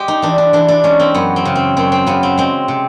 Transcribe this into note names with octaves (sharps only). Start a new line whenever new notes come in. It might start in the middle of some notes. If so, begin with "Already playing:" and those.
Already playing: G#3 G4
D#4
E3 D4
D4
E3 D4
D4
G#3 C#4
C4
F#2 B3
C4
C#3
C4
F#2 C4
C4
C#3 B3
C4
G#3 C4
C3